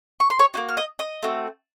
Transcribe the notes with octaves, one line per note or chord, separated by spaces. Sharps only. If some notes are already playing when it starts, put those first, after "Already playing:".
C#6
C6
C#5 C#6
A#3 D#4 F#4
F6
D#5 D#6
D#5 D#6
A3 C4 F#4